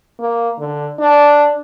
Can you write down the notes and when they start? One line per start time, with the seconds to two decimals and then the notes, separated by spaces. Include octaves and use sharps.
0.19 A#3
0.59 D3
1.00 D4